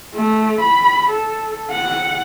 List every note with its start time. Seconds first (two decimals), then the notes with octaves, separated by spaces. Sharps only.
0.15 A3
0.61 B5
1.10 A4
1.71 F#5